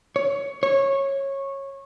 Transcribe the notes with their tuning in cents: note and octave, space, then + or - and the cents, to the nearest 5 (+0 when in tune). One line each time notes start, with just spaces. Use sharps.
C#5 +15
C#5 -15